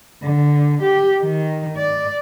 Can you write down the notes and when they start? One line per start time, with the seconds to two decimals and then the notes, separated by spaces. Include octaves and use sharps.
0.23 D3
0.82 G4
1.22 D#3
1.77 D5